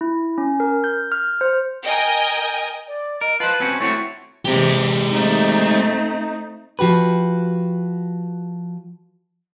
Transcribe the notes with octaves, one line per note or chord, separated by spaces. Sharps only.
E4
C#4
A#4
G6
F6
C5
A#4 D#5 G5 G#5
D5
A#4 D#5
F4 B4 C5 A5
C4 C#4 F#4
A3 C4 E4 F#4 C#5
C3 E3 G#3 G4
A3 C4 D#4
F3 F#4 G4 B4